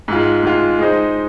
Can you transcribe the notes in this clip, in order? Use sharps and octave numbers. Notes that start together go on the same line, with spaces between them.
G#2 G#3 F4
G#2 G#3 F4
G#3 D#4 G#4 C5